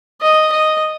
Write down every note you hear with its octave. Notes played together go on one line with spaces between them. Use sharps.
D#5
D#5